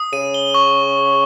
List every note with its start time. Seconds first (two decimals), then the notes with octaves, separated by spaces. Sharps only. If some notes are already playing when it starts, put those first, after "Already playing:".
Already playing: D#6
0.13 C#3 D#7
0.34 G7
0.54 C#6